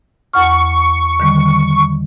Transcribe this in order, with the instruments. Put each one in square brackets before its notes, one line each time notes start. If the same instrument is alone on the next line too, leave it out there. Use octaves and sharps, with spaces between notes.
[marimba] E2 F#5 F6 [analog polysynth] C#6
[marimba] D3 D#3 G3